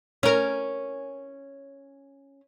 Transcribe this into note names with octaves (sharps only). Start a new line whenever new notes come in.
C#4 A#4